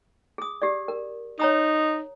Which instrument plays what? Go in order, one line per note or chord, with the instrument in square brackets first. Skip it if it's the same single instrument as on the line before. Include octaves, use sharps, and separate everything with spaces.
[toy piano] G#4 D#6
G4 G#4 D5
A#4
[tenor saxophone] D#4 [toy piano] C#5 A#5 D#6